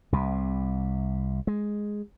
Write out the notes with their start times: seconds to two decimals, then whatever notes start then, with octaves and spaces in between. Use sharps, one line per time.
0.13 C2 C3
1.47 G#3